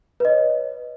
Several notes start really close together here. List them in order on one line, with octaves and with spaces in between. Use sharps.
B4 D#5 C#5